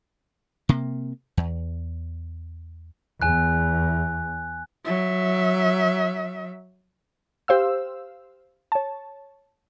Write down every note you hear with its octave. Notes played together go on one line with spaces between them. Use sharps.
C3 A#3
E2
E2 G#5 F#6
F#3 E5
G4 C5 F5 E6
C#5 A5